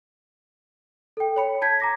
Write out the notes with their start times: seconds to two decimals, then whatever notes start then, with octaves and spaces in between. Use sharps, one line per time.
1.17 A4 G5
1.36 C#5 B5 C#7
1.61 A5 G6 G#6 B6
1.80 A#5 D6 A#6